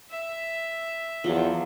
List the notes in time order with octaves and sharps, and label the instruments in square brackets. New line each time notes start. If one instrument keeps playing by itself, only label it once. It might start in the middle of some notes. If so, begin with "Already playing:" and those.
[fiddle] E5
[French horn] E2 [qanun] F3 F#3